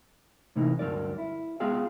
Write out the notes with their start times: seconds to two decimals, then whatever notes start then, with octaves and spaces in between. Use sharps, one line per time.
0.56 A2 C3 E3 A#3 D#4
0.79 D2 G2 F#3 A#4 D5
1.18 E4
1.60 G#3 B3 F4 G#4 F5 G5